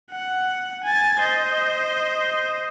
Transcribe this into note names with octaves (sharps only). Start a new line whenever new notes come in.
F#5
G#5 A6
C5 D#5